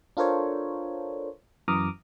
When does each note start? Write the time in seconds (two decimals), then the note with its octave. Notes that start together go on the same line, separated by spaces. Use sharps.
0.17 D4 F4 A4 A#4 C5 C#5
1.68 F#2 E3 A#5 D6 D#6 F6